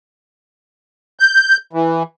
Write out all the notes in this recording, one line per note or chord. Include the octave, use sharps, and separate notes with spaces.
G6
E3